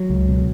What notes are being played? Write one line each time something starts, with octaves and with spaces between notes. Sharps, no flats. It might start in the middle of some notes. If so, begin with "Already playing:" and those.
Already playing: F#3
C#2
B2